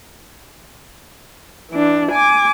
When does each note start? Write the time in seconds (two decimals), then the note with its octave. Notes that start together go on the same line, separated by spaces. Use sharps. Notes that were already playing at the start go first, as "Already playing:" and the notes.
1.71 E3 D4
2.11 G#5 D6